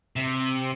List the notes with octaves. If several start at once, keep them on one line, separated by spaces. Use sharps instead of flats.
C3